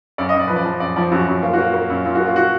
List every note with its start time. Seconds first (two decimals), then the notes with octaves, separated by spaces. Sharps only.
0.18 F#2 D5
0.29 D#5
0.34 F#2
0.39 D5
0.48 F3 B4
0.56 D5
0.65 F3
0.80 F#2 D5
0.96 F3 D5
1.12 F#2 F#4
1.28 F#2
1.43 A#3 F4
1.53 F#4
1.59 A#3
1.65 F4
1.74 A#3
1.90 F#2
2.05 F#2 F4
2.15 F#4
2.20 A#3
2.26 F4
2.36 F#4